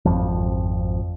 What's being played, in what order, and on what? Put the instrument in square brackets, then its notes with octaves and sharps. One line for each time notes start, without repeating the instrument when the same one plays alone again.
[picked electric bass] G#1 F2 F3